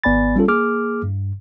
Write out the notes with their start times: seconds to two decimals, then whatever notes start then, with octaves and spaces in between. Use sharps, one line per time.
0.04 G#1 B3 D5 G#5 B5 A6
0.36 G3 C#4 F4 A4
0.48 A#3 G#4 D6 F6
1.03 G2